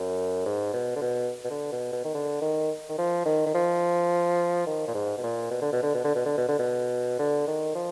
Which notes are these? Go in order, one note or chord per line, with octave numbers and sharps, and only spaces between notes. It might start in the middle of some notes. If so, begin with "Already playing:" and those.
Already playing: F#2
G#2
B2
D3
B2
B2
D3
B2
B2
D#3
D3
D#3
D#3
F3
D#3
D#3
F3
D#3
A#2
G#2
B2
A#2
B2
D3
B2
D3
B2
D3
B2
D3
B2
D3
B2
D3
D#3
F3